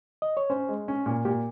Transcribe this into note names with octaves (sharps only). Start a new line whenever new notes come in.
D#5
C#5
C#4 C5
G#3
C#4
A#2
A#2 G4